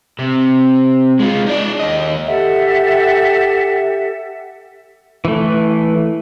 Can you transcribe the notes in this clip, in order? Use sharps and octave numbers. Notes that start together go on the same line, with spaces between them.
C3
G#3 F4
D#4 D5
D#2 D#5
G4 A4 E5 F#5
E3 A3